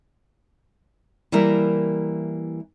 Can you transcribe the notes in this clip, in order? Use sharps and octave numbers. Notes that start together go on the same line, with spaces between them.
E3 G3 A#3 E4 A#4